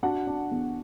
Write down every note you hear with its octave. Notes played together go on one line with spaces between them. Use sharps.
D4 F#4 F#5
D4
E2